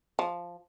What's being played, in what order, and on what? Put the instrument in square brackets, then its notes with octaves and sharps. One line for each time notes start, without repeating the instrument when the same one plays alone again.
[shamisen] F3